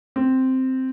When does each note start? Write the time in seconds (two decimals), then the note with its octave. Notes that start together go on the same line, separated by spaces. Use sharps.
0.16 C4